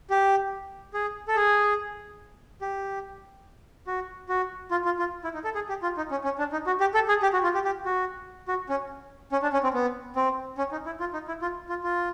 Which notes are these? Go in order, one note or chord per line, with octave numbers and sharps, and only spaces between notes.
G4
G#4
A4
G#4
G4
F#4
F#4
F4
F4
F4
E4
D#4
A4
G#4
G4
F4
D#4
C#4
C#4
D4
D#4
F#4
G4
A4
G#4
G4
F#4
F4
G4
G4
F#4
F#4
C#4
C#4
D4
C#4
C4
B3
C4
C#4
D#4
E4
F4
D#4
E4
F4
F4
F4